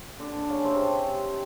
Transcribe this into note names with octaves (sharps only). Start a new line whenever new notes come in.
D3 D4
C#3 C#4
C3 C4